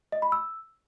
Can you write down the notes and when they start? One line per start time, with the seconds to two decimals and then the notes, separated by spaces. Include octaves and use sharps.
0.12 D#5
0.22 B5
0.32 E6